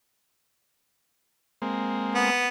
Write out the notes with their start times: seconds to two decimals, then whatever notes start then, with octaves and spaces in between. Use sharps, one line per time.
1.62 G#3 A#3 C4
2.15 B3